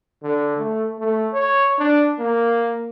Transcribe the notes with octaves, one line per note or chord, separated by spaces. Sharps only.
D3
A3
A3
C#5
D4
A#3